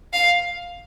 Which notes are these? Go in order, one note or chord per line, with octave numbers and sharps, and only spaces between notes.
F5